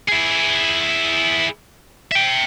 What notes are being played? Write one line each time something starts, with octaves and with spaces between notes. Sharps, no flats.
E4 G#4
E5 G5